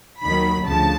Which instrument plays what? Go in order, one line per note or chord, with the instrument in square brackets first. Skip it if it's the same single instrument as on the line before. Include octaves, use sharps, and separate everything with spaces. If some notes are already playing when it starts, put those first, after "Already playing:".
[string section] D#2 D#3 F#3 B5
D2 C#3 F3 A5